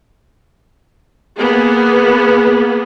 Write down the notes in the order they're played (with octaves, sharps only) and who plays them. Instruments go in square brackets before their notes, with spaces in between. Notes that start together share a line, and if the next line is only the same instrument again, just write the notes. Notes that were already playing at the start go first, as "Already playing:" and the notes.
[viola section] A#3 B3 G#4